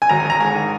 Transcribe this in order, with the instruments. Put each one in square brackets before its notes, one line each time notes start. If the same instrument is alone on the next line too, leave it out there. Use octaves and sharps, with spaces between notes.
[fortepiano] G#5
G#1 A#5
G#5
G#1 A#5
G#2 G#5
D#3